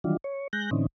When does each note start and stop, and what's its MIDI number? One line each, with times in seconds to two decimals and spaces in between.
0.04 0.17 51
0.04 0.17 52
0.04 0.17 54
0.04 0.17 55
0.04 0.17 62
0.04 0.17 65
0.24 0.48 73
0.53 0.70 56
0.53 0.70 90
0.53 0.70 91
0.53 0.70 94
0.71 0.86 45
0.71 0.86 50
0.71 0.86 52
0.71 0.86 60
0.71 0.86 61
0.71 0.86 63